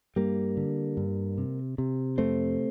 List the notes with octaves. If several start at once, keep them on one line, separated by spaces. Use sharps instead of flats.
G2 G3 A#3
D3
G2
C3
C3
F2 A3 C4